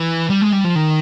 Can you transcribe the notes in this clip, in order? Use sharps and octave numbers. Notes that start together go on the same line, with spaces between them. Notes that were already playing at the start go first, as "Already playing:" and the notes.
Already playing: E3
G3
G#3
G3
F3
D#3